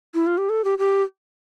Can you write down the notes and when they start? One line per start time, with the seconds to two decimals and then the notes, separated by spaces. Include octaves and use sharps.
0.15 E4
0.27 F4
0.38 G4
0.49 A4
0.64 G4
0.79 G4